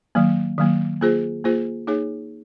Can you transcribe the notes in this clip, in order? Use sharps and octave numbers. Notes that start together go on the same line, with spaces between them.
D#3 F#3 A#3
D#3 F#3 A#3
A#3 F4 G#4 C5
A#3 F4 G#4 C5
A#3 D#4 G#4 C#5